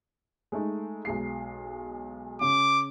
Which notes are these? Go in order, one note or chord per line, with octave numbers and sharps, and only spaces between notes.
G#3 A3 D#4
B1 G#3 C7
C#3 D6